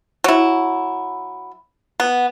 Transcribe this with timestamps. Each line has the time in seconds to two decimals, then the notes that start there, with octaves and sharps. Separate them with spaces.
0.24 F#3 E4
2.00 B3